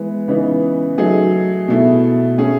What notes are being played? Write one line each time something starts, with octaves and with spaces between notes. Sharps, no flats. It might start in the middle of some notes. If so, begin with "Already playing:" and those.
Already playing: E3 G#3 B3
C#3 E3 B3 D#4
F#3 A3 D#4 G#4
B2 A3 E4
A3 C#4 G#4